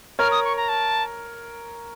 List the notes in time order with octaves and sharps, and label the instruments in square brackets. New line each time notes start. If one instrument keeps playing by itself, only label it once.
[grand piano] A#4 C#5 [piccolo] F6
[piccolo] D#6
C#6
A#5
A5